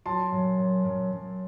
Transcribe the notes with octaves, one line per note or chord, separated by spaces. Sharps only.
F#3 A5 C6
F#2
F#2
F#2
F#2